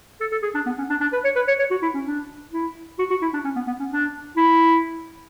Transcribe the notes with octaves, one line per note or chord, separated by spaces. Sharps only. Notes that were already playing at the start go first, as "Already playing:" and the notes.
A4
A4
G#4
D4
B3
C#4
D4
D4
B4
C#5
B4
C#5
C#5
F#4
E4
C#4
D4
E4
F#4
F#4
E4
D4
C#4
B3
B3
C#4
D4
E4